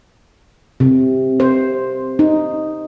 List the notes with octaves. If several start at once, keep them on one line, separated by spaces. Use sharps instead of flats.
C3
C5
D#4